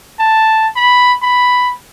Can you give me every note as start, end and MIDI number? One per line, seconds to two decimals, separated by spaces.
0.19 0.67 81
0.76 1.13 83
1.22 1.72 83